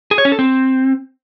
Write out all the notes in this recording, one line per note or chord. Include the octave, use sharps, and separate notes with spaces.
G#4
C#5
C#4
A4
C4